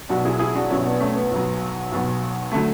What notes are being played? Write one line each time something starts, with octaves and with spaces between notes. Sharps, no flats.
B1 B2 F#3 D4 F#4
E4 G#4
E4 G#4
D4 F#4
B1 B2 F#3 C#4 E4
B3 D4
A3 C#4
B3
B1 B2 F#3
B1 B2 F#3
D3 F#3 A3